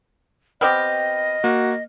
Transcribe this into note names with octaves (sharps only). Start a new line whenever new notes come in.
B3 C4 G4 D#5 B5 F6
A#3 F#4